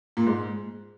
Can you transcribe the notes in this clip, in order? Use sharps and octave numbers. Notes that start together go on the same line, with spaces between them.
A#2
G#2